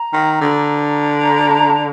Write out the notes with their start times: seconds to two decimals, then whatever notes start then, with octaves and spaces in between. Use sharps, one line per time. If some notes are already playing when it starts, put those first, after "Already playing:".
Already playing: A#5
0.13 D#3
0.41 D3
1.24 A#5
1.51 A5
1.60 A#5
1.70 A5